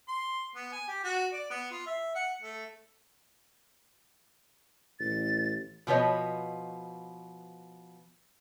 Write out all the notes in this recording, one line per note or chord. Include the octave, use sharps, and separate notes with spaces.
C6
B3
G#5
G4
F#4
D5
B3
F4
E5
F#5
A3
A1 A6
B2 F3 B4 C#5 D#5